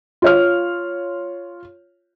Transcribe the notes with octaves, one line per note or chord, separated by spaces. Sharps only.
F4 C#5 F6